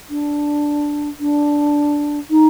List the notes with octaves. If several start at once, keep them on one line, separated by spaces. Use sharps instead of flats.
D4
D4
D#4